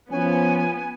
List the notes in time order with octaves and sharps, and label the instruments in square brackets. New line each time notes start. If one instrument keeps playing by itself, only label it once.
[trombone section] F3 C#4 [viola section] B3 [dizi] G#5